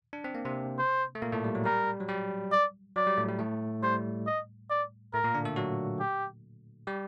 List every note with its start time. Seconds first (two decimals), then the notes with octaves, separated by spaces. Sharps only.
0.13 D4
0.24 C4
0.35 A#3
0.45 C3 C4
0.78 C5
1.15 A3
1.22 A#2 A#3
1.33 A2 A3
1.44 G3
1.55 F#3
1.65 G3 A#4
2.00 F#3
2.09 G3
2.52 D5
2.96 F#3 D5
3.07 G3
3.17 A2 A3
3.28 G3
3.39 A2 A3
3.83 G3 C5
4.27 D#5
4.70 D5
5.14 A2 A3 A#4
5.24 A#2 A#3
5.34 D3 D4
5.45 A3 A4
5.56 F#3 F#4
6.00 G4
6.87 G3 G4